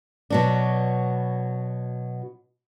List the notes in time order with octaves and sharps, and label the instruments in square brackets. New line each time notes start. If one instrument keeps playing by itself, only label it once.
[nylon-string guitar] B2 F#3 D4